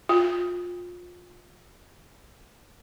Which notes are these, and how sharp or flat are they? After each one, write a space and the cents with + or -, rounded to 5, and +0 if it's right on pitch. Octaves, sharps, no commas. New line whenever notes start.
F4 +25